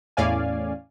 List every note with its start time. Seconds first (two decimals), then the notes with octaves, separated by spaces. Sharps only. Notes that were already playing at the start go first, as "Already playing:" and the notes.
0.17 E2 A2 C#4 D5 F5 G#5